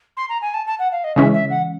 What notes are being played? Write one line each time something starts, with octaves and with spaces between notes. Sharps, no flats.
C6
A#5
G#5
A5
A5
F#5
F5
D#5
C#3 E3 G#3 C#4 E5
E5
F#5